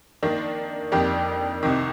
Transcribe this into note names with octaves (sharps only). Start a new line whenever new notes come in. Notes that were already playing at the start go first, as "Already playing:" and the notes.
D#3 A#3 D4
F2 D#3 A#3 D4 G4
C2 C3 D#3